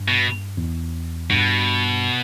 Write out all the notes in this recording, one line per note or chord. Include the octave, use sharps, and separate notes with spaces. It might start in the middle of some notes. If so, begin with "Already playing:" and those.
Already playing: G2
B2
E2
G2 B2